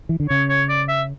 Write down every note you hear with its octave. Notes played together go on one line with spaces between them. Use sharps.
E3
D3
C#3 C#5
C#5
D5
E5